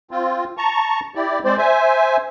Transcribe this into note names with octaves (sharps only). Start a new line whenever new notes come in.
C4 F4
A5 A#5 C#6
E4 G4 D5
G#3 C4 C5 D5
C5 E5 G#5